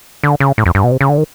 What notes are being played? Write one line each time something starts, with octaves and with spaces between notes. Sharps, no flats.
D3
C#3
A2
F2
G2
B2
C3
C#3
D3
D#3